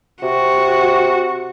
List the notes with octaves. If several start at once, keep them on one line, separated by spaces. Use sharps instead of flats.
C3 F#4